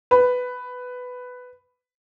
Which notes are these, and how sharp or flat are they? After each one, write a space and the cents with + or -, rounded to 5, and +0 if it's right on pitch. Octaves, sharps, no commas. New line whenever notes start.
B4 +10